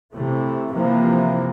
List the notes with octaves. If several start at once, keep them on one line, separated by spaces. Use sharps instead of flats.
C3 E3 A3
C3 E3 F3 A#3